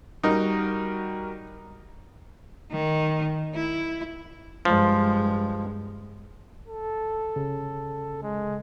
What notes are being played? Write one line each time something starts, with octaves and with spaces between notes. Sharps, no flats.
G3 D#4 F#4 A#4
D#3
E4
G2 F3 G#3
A4
C#3
G#3